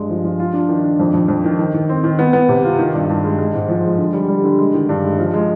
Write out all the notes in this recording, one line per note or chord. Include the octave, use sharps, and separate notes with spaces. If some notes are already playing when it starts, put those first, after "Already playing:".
Already playing: G2 G#3
F3
F3
F4
D4
D#3
D4
F2
F2
F2
D#3
D#3
D#3
C4
D#3
B3
B3
C3
F4
D#3
G2
G2
G#3
G#3
G#2
F3
G#3
D3
G3
G3
D3
G#3
D#3
G2
G#3
F3
G#3